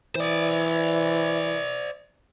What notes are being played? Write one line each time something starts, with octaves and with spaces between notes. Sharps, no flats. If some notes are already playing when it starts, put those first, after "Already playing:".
E3 C5 D5